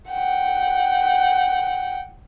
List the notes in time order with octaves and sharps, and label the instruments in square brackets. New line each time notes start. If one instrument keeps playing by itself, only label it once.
[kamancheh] F#5 G5